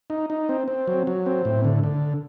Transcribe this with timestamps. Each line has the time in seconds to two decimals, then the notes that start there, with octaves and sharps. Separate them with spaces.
0.10 D#4
0.30 D#4
0.49 C4
0.68 C4
0.88 F#3
1.07 F#3
1.26 C4
1.45 A2
1.65 D3
1.83 D3